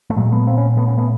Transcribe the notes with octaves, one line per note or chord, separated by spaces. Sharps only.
A3
A#2 F#3 G#3
A3 B3
A#3 C4
B3 C#4
A3 B3
B3 C#4
A3 B3